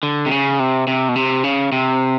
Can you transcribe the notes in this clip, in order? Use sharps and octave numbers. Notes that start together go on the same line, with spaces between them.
D3
C3
C#3
C3
C3
B2
C3
C#3
C3